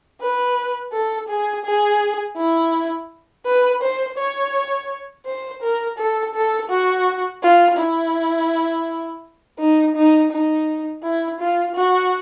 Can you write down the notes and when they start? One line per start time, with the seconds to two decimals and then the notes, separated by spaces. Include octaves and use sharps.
0.21 B4
0.93 A4
1.29 G#4
1.65 G#4
2.37 E4
3.46 B4
3.82 C5
4.18 C#5
5.26 C5
5.62 A#4
5.98 A4
6.35 A4
6.70 F#4
7.43 F4
7.78 E4
9.59 D#4
9.96 D#4
10.31 D#4
11.03 E4
11.40 F4
11.76 F#4